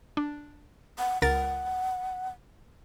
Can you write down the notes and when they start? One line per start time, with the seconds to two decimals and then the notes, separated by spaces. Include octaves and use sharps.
0.17 D4
0.98 F#5
1.22 C#2 A#4 F#5 A6